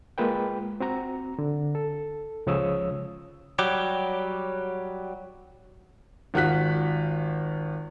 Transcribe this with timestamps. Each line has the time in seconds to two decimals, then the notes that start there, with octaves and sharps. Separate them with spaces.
0.18 G#3 A#3 F4 B4 G5
0.80 C4 F#4 A#5
1.39 D3
1.75 A4
2.46 C#2 C#3 F3 C#5 D#6 E6
3.59 F#3 G3 G4
6.34 G#1 F4 F#4 F#6 B6